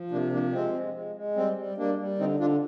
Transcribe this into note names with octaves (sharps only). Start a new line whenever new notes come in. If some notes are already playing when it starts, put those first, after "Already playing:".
Already playing: F3
C3 A#3 D4
F3 A#3 D4
G#3 C4
G#3
G#3
G#3
G3 C4
G3
G3 A#3 D4
G3
D3 C4 D#4
D3 D4 F4